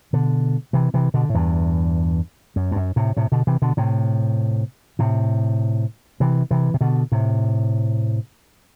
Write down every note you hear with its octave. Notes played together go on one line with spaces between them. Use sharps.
B2 D3
C3 E3
C3 E3
B2 D3
A2
E2 G2
F#2
G2
F#2
A2 C3
A2 C3
B2 D3
C3 E3
B2 D3
A2 C3
A2 C3
C3 E3
C3 E3
C3
B2 D3
A2 C3